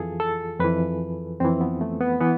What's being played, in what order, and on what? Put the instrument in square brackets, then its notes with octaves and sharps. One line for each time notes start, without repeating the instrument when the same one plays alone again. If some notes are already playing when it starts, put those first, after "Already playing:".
Already playing: [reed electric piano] F2 E3 F4 G#4 A4
A4
F2 E3 B4
F2 E3 C4
B3
A3
B3
E3 B3